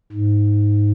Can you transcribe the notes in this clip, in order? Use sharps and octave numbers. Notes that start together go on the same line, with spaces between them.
G#2